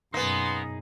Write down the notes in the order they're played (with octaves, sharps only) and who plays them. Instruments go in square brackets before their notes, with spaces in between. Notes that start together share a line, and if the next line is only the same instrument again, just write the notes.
[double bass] F#2 B2 [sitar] A#3 B3 [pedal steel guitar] D#4 G#4 [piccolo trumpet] C6